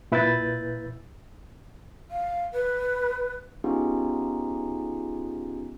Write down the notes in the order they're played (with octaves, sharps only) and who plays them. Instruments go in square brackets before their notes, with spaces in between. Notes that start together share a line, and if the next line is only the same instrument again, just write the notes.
[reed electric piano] A#2 E4 B4 E6 G6 A6
[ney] F5
B4
[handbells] B3 C#4 D#4 F4 G4 G#4